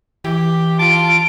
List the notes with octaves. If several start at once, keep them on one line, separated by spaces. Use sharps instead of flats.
E3 G4
F4 A5 D7